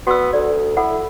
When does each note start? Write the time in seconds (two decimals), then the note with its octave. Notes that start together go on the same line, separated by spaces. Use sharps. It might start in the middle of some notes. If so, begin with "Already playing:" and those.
0.07 B3 F#4 E6
0.33 D2 D5
0.77 E4 A4 F#5